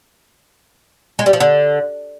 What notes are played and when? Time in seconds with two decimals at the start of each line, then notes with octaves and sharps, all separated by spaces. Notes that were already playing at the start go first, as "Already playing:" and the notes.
1.19 G#3
1.26 G3
1.33 F3
1.40 D3